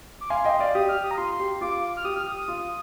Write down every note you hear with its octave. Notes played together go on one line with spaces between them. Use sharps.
D6
F5 G#5 C6
D#5 G5
D5 F5
G4 D#6
F6
D#6
A#5
F4 C6
C6
G4
F4 D6
F6
G4 D#6
F6
D#6
D#6
F4